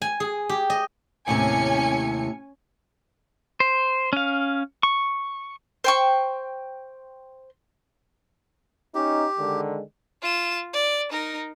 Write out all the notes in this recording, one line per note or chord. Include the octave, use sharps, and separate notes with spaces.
G#5
G#4
G4
D#5
D#2 A2 C3 C#4 G#5 C#7
C5
C#4 F5
C#6
C5 G5 C#6
C#4 D#4 G4
D3 D#3 G#3
F4 E7
D5
D#4 A#4